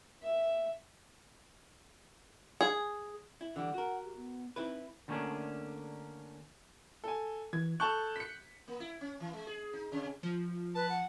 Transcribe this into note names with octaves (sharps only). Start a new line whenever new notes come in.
E5
G#4
E4
D3 E3 G3 F#5
F#4 A#4
G4
B3
C4 D#4 E4 B4
D3 G3 A3 A#3 C#4 D4
A4 G#5
E3 G#6
A4 A5 C#6 F#6 G6
B6 C#7
A#3
E4
C#4
E3
G#3
G#4
D#4
C3
F3
B4 A5
F#5